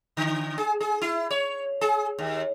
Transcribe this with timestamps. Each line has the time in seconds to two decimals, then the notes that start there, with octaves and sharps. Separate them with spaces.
0.17 D3
0.58 G#4
0.80 G#4
1.02 E4
1.31 C#5
1.81 G#4
2.19 D#2